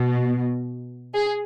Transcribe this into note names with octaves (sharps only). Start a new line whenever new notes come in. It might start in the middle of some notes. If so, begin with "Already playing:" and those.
Already playing: B2
G#4